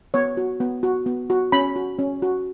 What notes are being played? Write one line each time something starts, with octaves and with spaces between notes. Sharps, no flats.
B3 C#5
F#4
B3
F#4
B3
F#4
C#4 B5
F#4
C#4
F#4